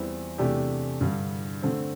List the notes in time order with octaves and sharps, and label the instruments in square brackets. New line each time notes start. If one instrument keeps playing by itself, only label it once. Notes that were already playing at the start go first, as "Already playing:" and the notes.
Already playing: [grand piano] E2 E3 G3 C4 E4
E2 C3 A3 D4 G4
G2 D3 G3
D3 A3 C4